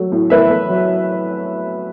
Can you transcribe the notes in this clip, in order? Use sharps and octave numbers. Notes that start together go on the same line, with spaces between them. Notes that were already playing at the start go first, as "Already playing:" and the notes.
Already playing: F#3 A3
A2
A2 B4 E5
A3
F#3